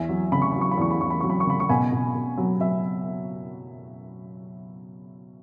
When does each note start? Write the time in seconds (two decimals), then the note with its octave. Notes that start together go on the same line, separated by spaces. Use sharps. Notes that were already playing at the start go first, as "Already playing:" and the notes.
Already playing: E2 E5 G#5
0.09 F#3
0.32 C#3 B5
0.42 C#6
0.52 F#3 B5
0.61 C#6
0.71 B5
0.78 E2 C#6
0.91 B5
1.01 E2 C#6
1.10 B5
1.20 F#3 C#6
1.30 B5
1.40 C#6
1.46 C#3 B5
1.60 C#6
1.69 B2 G#5 B5
1.92 B2
2.15 B2
2.38 F#3
2.60 F#3 E5